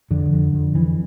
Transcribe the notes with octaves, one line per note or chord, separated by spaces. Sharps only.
F2 D3
F2
F2
F2 E3